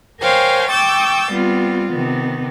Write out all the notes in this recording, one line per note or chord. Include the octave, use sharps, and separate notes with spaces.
A#4 C5 C#5 F5 G5 G#5
G5 C#6 D6 E6 G6 A6
G3 B3 C4 F4
C3 D#3 B3